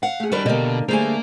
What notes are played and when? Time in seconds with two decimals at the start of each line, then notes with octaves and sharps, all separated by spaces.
0.03 F5 F#5
0.20 A3 G#4
0.32 D#3 G3 D4 F#4 A#4 B4
0.46 B2 D3 A#3 G4 D#5
0.89 D3 G3 A3 A#3 G#4 C5 G#5